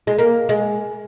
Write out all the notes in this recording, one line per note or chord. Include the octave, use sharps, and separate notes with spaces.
G#3
A#3
G#3